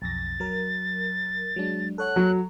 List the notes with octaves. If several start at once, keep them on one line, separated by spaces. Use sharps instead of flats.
B1 F2 A6 A#6
F#3 A#4
F#3 G#3 D4
A4 C#5 F#5 F#6
F#3